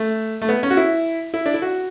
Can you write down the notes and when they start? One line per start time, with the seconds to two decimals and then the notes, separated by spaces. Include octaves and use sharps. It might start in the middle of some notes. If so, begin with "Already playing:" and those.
Already playing: A3
0.42 A3
0.49 B3
0.63 C#4
0.70 F#4
0.77 E4
1.34 E4
1.46 D4
1.54 E4
1.62 F#4